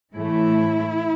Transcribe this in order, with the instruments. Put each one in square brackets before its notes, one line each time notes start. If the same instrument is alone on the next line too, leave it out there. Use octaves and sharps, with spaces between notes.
[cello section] A2 E3 A3 E4